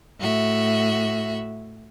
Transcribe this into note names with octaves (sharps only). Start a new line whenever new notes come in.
A2 F#4 E5